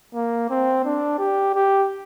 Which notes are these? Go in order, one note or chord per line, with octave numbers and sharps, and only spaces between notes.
A#3
C4
D4
G4
G4